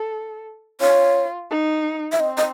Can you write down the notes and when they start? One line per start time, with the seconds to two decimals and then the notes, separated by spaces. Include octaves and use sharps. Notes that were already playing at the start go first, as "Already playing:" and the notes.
Already playing: A4
0.81 F4 C#5
1.51 D#4
2.12 E5
2.20 C4 D#5
2.37 D#5